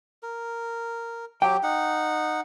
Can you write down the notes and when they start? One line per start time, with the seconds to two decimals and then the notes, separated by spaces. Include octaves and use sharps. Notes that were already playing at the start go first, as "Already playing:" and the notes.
0.23 A#4
1.42 F#3 G4 G5
1.63 D#4 F#5